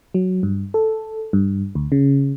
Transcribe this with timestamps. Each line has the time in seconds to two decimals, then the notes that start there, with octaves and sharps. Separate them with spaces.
0.14 F#3
0.43 G2
0.74 A4
1.33 G2
1.75 D2
1.92 C#3